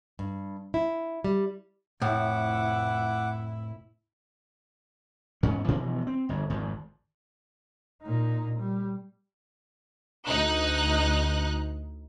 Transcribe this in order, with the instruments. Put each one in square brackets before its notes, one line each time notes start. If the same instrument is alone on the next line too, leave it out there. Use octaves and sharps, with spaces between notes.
[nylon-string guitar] G2
E4
G3
[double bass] F1 E4 [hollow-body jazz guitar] A2 [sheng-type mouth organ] F#5 D6
[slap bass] E2 G#2 E3 C#4
G2 B2 E3 F3
C4
G1 F2
G#1 F2
[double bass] A#2 D#4
G3
[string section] D2 D#4 F#6